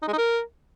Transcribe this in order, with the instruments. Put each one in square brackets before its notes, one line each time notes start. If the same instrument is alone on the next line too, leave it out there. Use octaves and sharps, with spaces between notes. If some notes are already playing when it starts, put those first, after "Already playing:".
[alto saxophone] D#4
G#3
D#4
A#4